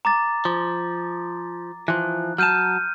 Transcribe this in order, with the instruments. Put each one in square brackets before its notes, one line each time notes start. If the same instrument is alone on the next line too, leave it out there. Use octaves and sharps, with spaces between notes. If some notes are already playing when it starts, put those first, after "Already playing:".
[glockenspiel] A#5 D6 A6
[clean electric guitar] F3
[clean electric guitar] E3 F3 [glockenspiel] F#6
[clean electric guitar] F#3 A5 [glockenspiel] F6 G6 D#7